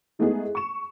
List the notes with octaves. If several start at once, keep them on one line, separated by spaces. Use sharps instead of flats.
G#3 A3 B3 D#4 E4 G#4
C#6 E7